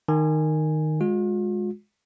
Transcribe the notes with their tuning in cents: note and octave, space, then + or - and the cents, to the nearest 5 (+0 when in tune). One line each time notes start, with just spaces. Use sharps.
D#3 -10 G#5 -10
G#3 +0 F4 +45